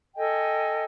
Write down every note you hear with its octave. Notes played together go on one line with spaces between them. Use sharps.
A4 D#5 G5 G#5